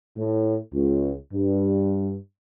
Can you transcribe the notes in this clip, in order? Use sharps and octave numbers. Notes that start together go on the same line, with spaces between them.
A2
C#2
G2